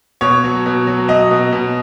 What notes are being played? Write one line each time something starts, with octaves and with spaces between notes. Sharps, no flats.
B2 C#5
F#3
B2
F#3
F#3 D#5
B2
B2